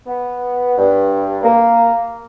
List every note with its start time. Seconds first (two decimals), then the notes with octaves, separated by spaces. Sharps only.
0.07 B3
0.78 G2
1.43 A#3